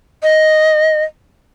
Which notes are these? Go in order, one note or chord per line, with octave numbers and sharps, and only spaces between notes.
D#5